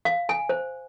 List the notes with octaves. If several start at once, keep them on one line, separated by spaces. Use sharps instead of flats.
F5
G#5
C5